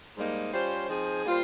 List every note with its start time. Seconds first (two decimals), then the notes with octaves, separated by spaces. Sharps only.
0.17 G#2 G3 A#3 D#4
0.53 G3 C#4 F4 C5
0.88 F3 C4 D#4 G#4
1.24 G3 A#3 F4 C5